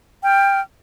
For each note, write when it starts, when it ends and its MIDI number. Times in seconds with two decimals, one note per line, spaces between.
0.24 0.60 79
0.24 0.60 89